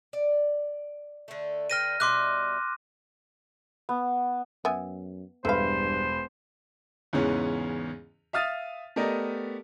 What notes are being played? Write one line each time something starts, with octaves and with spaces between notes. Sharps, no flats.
D5
D3 A3
D3 B4 G5 F6 A#6 D#7
B2 G3 E5 C6 D6 F#6
B3
F#2 B3 E5 G#5
E1 G2 A3 B4 C5 F5 B5
E2 G#2 C#3 E3 B3 C#4
E5 F5 D#6 F6 A6 D#7
A3 B3 G4 A#4 D5 D#5